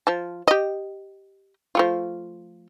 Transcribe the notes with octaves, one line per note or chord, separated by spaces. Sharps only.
F3 A5
G4 D#5
F3 A3 F4